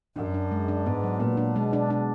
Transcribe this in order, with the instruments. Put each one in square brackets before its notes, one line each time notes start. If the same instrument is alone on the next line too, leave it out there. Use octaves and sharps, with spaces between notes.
[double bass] F#2 [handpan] D4
[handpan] D4
G#3
D4
[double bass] G#2 [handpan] B3
[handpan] F#3
[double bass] A#2 [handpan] B3
[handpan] D4
[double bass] B2 [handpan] G#3
[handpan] D4
D4